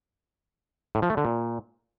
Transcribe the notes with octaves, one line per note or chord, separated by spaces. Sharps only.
A2
F3
A3
D3
A#2